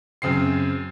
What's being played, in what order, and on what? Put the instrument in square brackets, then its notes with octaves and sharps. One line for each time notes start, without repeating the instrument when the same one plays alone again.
[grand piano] F#2 C#3 C4 C7